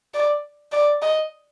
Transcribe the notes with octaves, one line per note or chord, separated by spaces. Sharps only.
D5
D5
D#5